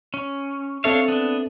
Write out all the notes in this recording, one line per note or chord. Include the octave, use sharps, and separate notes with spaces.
C#4
C4 D4 A4 C#5 E5 F5
B3 D4